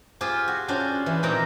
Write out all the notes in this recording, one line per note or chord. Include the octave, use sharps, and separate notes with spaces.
F4 G4 G#4 C5
F#4
C#4 D4 F4 F#4 C5
E3
A#2 C4 D#4 G5 A#5